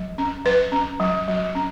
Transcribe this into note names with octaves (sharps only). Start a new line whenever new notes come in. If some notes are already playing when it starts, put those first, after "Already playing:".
Already playing: F#3
C#4
F#3 B4
C#4
F#3
F#3
C#4